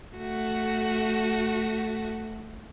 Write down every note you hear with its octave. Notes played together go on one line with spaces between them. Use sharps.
A3 F#4